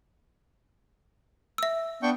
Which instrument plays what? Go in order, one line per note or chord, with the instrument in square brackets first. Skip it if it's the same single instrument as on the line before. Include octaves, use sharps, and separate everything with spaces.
[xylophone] E5 E6
[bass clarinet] B3 [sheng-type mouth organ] D4 G5 C#6